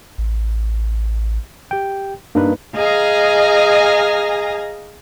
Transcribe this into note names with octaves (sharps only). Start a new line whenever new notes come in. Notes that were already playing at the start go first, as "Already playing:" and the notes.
A1
G4 G5
G2 A#3 D#4 B4
G#4 D#5 F5 G#5 A#5